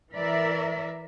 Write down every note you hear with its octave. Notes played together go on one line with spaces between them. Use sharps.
E3 A#4 D5 E5